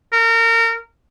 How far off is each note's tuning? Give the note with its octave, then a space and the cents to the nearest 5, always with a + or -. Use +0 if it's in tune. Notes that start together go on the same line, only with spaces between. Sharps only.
A#4 -30